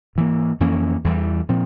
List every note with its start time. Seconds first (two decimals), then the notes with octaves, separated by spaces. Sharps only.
0.16 G#2 E3 A#3
0.60 F2 E3 A#3 C#4
1.04 E2 E3 G3
1.49 A#2 F3 C4